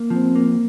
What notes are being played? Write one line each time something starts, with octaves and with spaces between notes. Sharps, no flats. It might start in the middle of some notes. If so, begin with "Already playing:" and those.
Already playing: A#3
F3 C4
A#3